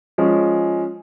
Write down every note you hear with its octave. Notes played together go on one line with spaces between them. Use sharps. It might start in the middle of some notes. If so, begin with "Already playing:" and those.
F3 G#3 C#4